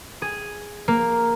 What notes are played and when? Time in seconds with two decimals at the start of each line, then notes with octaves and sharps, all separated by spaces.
0.22 G#4
0.88 A#3